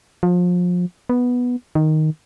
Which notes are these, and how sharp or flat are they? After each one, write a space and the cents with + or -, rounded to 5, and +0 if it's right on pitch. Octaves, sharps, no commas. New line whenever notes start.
F3 +30
B3 -5
D#3 +0